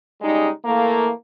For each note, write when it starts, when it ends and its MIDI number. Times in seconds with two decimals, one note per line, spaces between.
0.21 0.48 49
0.21 0.48 55
0.21 0.48 56
0.21 0.48 63
0.63 1.09 52
0.63 1.09 57
0.63 1.09 58